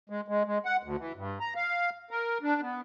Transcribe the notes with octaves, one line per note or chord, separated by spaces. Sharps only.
G#3
G#3
G#3
F#5
D2
E3
G2
A#5
F5
A#4
D4
B3